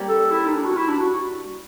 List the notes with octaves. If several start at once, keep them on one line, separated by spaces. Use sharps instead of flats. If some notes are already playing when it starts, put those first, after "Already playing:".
Already playing: G3 A#3 C#4
A4
E4
D#4
D4
F#4
E4
D4
F#4